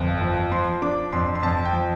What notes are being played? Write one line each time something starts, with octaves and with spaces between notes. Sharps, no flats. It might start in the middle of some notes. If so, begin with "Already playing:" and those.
Already playing: G1 F2
F3
F3 C6
D4 D6
F2 C6
C6
F2 A5
G5
F3